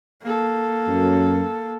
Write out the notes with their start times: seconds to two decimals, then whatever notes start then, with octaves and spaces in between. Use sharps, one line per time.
0.22 A#3 A4
0.87 F#2